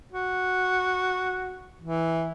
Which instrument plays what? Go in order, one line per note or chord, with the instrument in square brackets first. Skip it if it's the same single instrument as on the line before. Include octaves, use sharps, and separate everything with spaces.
[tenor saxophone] F#4
E3